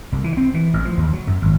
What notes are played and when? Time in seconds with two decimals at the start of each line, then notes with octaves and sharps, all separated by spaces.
0.12 C2
0.24 E3
0.37 C4
0.54 E3
0.74 A1
0.85 F3
0.97 D#2
1.13 F#3
1.27 F#2
1.42 G#1